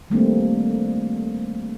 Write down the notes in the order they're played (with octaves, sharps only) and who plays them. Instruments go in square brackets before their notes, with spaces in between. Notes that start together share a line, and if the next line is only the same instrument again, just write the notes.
[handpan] D#3 G3 A3 A#3 C4 D4